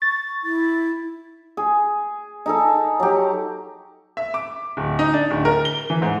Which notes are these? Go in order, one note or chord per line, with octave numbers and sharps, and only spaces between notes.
C#6 A6
E4
G#4
D#4 G#4 A4
F#3 G4
E5
D6
D1
D#4
D4
D1
A#4
G7
E3
G#2